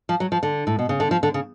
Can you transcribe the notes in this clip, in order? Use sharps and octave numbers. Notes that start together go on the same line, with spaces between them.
F3
F#3
F3
D3
A2
B2
C#3
D3
F3
D3
C#3